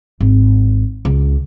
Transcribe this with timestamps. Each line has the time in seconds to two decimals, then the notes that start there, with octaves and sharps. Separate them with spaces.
0.20 G#1
1.05 C#2